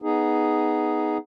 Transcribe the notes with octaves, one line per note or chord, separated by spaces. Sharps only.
B3 D#4 G#4